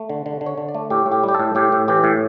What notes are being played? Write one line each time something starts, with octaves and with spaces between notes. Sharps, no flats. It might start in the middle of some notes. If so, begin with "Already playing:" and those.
Already playing: A3
D3
D3
D3
C#5
D3
D5
A3
A2 G4
A2
G4
G3 G4
A4
A2
A2 G4
A2
E3 G4
A2